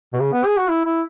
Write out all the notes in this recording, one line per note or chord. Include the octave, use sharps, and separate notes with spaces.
B2
C#3
B3
G#4
F#4
E4
E4